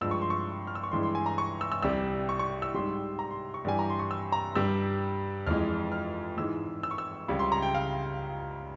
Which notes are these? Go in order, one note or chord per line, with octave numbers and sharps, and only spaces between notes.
G2 F3 G#3 E6
C#6
C6
C#6
F6
E6
C#6
G2 E3 G#3 C6
C6
G#5
A#5
C#6
E6
E6
C2 C3 G3 E6
C#6
C#6
E6
G#2 G3 C6
A#5
C6
C#6
G2 E3 G3 G#5
A#5
C6
C#6
E6
A#5
G2 G3 E6
F2 E3 G#3 F6
F6
G#2 E3 G#3 E6
E6
C#6
E6
C#2 C#3 G3
C6
A#5
G5
F5